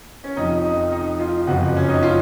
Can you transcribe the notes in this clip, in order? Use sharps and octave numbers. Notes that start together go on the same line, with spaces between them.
C#4
F1 F2 F3 D#4
D#4
D#4
F4
F#1 F2 F3 F#4
C#4
D#4
F4